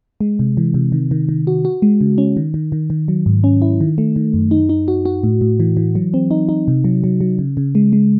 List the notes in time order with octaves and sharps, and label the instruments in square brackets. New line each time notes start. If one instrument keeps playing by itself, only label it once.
[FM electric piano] G#3
C3
E3
C3
D#3
D#3
D#3
F#4
F#4
G#3
C#3
C#4
D#3
D#3
D#3
D#3
F#3
G#2
C#4
E4
D#3
A3
D#3
F#2
D#4
D#4
F#4
F#4
A2
A2
E3
E3
F#3
C4
D#4
D#4
C3
F#3
F#3
F#3
C#3
C#3
G#3
G#3